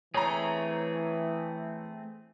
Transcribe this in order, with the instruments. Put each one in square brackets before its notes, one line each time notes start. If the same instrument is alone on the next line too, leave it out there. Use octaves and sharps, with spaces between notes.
[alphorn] E3 [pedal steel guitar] A3 C4 G#4 [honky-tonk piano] C#5 A#5